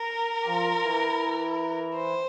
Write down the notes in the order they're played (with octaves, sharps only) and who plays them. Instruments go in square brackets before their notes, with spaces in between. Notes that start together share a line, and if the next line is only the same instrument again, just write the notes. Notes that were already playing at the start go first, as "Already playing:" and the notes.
Already playing: [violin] A#4
[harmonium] G4
F3 F4
F4
E3 E4
[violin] C5